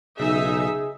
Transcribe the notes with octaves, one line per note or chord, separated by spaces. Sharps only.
B1 C#3 D#4 G#4 E5